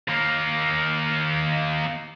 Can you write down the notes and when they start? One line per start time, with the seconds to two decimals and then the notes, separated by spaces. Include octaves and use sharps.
0.08 D#2 A#3